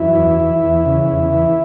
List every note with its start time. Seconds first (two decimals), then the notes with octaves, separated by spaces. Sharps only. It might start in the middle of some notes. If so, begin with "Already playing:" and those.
Already playing: F#2 E3 E4
0.15 E2
0.40 E3
0.63 E2
0.85 C#3
1.09 E2
1.33 E3